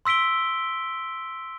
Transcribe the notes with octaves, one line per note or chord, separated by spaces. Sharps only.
C6 E6 B6 D7 G7